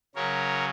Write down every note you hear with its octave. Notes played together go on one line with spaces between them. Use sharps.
C#3 F#3 C#4 A#4 C#5